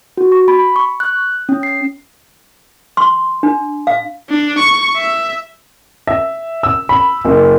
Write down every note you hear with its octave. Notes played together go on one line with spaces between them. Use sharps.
F#4
C#6
B5
C#6
F#6
C#4
C7
C6
D4
F5
D4
C#6
E5
E5
E6
B5
F#1